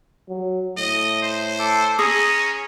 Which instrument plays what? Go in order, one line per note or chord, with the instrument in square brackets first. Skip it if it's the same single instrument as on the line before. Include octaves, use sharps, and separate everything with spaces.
[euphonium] F#3
[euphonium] A2 [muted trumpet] D#5
[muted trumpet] C5
[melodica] A4 D6
[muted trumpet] C#4 [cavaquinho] G#4 [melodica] A#5 D#6